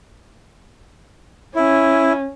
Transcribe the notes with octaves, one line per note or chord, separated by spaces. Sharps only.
C#4 E4